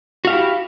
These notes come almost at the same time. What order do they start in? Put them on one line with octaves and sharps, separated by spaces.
F#4 F5 G4 E4